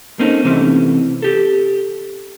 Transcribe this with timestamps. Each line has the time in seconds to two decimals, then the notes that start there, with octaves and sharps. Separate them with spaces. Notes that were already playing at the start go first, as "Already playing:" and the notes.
0.19 A#3 C4 C#4 D#4 A4
0.45 C3 E3 A3 C4 C#4
1.22 G4 A4